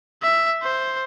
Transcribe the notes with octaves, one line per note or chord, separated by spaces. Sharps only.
E5
C5